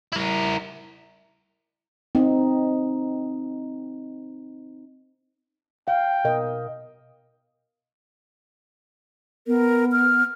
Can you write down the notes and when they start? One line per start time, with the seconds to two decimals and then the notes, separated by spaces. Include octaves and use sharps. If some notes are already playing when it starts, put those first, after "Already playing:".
0.13 E4 A#4
2.15 C4 D#4
5.88 F5 G5
6.25 B2 A#4 D#5
9.47 B3 A#4
9.92 F6